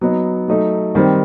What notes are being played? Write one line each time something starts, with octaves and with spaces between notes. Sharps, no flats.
F#3 B3 D#4
F#3 A3 D#4
D#3 G3 C4